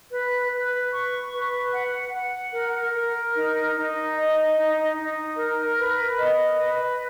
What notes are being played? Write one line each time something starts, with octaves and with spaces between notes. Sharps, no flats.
B4
B4
C#6
B4
F#5
F#5
A#4
A#4
D#4
D#4
D#5
D#4
D#4
A#4
B4
D#5
B4